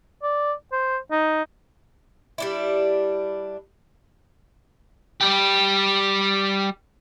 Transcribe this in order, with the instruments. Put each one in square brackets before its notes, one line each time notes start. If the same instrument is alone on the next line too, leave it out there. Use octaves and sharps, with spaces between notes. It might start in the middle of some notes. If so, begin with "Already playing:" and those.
[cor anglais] D5
C5
D#4
[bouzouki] G3 D4 E4
[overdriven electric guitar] G3 G4